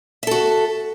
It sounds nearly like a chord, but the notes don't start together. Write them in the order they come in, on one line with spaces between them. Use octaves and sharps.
E5 A4 F#4